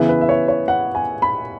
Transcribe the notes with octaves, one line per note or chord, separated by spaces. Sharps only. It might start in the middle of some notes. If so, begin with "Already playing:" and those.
Already playing: C#3 E3 B3 E4
B4
E5
C#5
C#5
F#5
G#5
B5